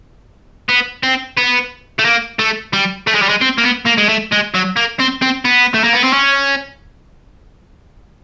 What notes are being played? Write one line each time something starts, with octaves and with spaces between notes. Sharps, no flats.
B3
C4
B3
A3
A#3
A3
G3
A3
G#3
G3
G#3
C4
A#3
B3
A#3
G#3
A3
G#3
F#3
A#3
C4
C4
B3
A3
A#3
B3
C4
C#4